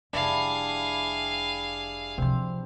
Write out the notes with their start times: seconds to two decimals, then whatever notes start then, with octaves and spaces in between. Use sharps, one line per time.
0.13 F1 G3 D4 E4 G#4 F5
2.18 C3 F3 C4